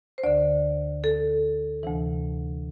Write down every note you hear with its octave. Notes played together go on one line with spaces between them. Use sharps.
C5
D2 D3 D5
A4
D2 C3 E3